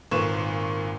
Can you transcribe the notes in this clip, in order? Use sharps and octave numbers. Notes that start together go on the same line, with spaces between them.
G#1 A#2 B4 C#6 E7